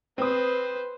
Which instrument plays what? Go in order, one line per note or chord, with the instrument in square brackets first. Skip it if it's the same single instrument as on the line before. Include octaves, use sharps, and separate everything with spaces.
[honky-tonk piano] C4 D#6 [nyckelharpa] B4 C5